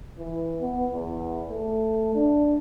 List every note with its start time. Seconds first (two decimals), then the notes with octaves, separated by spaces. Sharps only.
0.19 E3
0.61 B3
0.92 E2
1.50 A3
2.15 D4